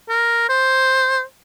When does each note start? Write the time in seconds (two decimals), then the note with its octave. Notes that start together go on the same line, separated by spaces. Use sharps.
0.09 A#4
0.49 C5